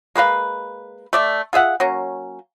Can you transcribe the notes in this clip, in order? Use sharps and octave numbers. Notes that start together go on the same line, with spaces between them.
G#3 A#3 B4 F5
A3 D5 E5
F4 G#4 E5 F#5
F#3 A#3 C#4